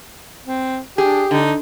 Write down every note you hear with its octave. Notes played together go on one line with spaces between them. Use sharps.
C4
D4 G4 G#4
D3 D#4